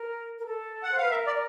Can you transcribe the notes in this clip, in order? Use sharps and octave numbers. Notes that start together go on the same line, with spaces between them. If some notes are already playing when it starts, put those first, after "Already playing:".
Already playing: A#4
A#4
A4
F#5
C5
B4 F5
A#4 E5
D5